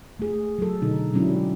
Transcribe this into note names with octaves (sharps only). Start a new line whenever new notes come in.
A3 G#4
F#3 A4
B2 D3 D#4
F#3 G#3 C#4 D4 E4
G4